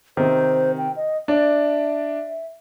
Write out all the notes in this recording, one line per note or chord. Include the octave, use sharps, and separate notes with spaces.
C3 D#3 C5
G5
D#5
D4 D5 E5